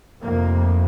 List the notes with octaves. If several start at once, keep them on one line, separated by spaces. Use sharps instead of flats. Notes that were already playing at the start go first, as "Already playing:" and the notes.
F1 F2 C3 A#3